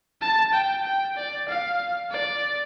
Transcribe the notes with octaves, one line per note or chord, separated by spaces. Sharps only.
A5
G5
G5
D5
F5
D5